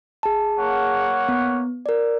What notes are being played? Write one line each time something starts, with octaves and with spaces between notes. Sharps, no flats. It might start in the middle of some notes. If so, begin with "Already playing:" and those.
G#4 A5
A#3 C#5 F#5
B3
A#4 D5